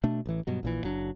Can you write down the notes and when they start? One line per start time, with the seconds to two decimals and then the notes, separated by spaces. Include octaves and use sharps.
0.04 B2 A3 D4
0.26 A1 E3
0.47 G2 B2 F#3
0.63 A#1 A#2 E3
0.83 F#1 F#3 D4